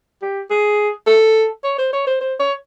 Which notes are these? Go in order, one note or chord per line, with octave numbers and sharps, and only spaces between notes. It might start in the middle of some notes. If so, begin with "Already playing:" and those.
G4
G#4
A4
C#5
C5
C#5
C5
C5
C#5